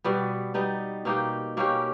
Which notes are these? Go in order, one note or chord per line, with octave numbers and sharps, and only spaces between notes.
B2 G3 B3
G3 B3 D#4
B2 A#3 D#4 G4
B2 A#3 C#4 G4